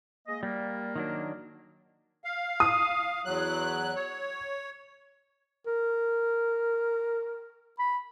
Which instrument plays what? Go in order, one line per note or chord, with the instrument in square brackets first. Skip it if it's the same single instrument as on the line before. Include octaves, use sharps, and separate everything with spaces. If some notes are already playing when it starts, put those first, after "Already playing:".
[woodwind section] G#3 A#3 D#5
[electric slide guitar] G3 [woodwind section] A#3
[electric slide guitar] D#3 F#3 D4
[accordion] F5
[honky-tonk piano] D#6
[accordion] E2 F#3 F#6
C#5
[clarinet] A#4
B5